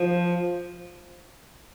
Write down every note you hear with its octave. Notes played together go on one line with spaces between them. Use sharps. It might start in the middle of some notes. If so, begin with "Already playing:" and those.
Already playing: F3